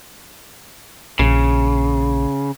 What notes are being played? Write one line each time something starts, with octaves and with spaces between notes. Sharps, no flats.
A#1 C#3